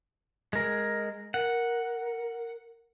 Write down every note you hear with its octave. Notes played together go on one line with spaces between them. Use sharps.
G#3 A#4
A#4 F#5